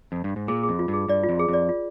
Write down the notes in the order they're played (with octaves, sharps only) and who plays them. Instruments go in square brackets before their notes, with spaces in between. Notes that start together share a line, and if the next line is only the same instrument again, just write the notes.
[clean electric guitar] F2
G2
G#2
[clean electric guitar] A#2 [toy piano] G#4
[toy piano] G#4
[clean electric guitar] F2
[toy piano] F4
[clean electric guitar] G2
[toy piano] G#4
[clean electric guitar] G2 [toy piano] D5
[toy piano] F4
[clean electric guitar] F2
[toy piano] G#4
[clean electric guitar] F2 [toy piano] D5
[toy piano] F4